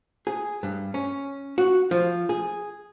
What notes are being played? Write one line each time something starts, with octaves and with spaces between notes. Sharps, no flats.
G#4
G2
C#4
F#4
F3
G#4